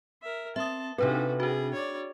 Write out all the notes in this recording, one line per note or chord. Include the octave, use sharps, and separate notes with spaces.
A#4 E5
C4 E5 A5 D#6
C3 C4 D4 D#4 F#4 A4 B4
D4 F#4 G#4
C#5 D5